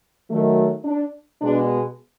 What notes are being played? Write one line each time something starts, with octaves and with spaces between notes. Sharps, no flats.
D#3 F#3 A3
D4
B2 G#3 B3 D4